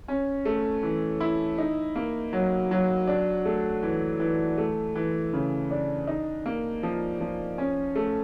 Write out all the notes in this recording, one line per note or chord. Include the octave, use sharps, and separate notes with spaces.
C#4
A3
E3
E4
D#4
A#3
F#3
F#3
D4
A3
E3
E3
A3
E3
C#3
D4
D#4
A#3
F3
F3
C#4
A3